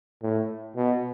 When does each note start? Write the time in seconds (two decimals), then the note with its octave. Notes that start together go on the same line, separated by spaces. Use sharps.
0.22 A2
0.76 B2